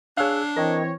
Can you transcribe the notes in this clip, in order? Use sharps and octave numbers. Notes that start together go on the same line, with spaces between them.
D4 G#4 C#5 F5 E6 F#6
E3 C4 A#4 C#5 D#5 G5 A#6